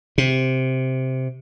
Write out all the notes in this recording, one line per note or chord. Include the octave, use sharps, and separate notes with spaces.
C3